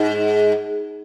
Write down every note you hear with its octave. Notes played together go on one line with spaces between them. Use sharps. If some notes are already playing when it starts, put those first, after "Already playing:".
Already playing: G#2